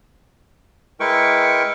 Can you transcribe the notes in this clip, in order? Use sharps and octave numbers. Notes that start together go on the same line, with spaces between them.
G#3 E4 A#4 B4 G5 C#6